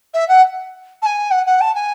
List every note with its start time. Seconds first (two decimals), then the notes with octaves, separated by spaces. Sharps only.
0.14 E5
0.28 F#5
1.02 A5
1.06 G#5
1.31 F#5
1.46 F#5
1.61 A5
1.75 G#5